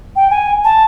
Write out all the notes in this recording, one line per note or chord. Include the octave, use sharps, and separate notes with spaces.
G5
G#5
A5